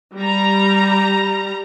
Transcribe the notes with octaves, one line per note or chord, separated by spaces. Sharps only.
G3 A#5